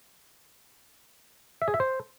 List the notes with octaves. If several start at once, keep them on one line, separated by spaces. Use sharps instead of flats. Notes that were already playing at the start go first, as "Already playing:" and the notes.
E5
G#4
E5
C5